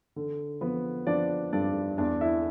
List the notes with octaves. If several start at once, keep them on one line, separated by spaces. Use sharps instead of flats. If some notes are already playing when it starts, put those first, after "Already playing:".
D3
F3 B3 B4
F3 D4 D5
G2 D4 D5
E2 D4 D5
E4 E5